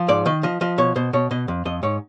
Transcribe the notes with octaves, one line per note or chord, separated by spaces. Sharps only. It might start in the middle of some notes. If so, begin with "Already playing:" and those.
Already playing: F3
G#2 D5
D#3 D#5
F3 D#5
F3 D#5
B2 C#5
B2 C5
B2 C#5
B2 D#5
F2
F2 D#5
G#2 C#5